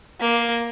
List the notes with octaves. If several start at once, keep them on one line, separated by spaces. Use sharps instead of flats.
A#3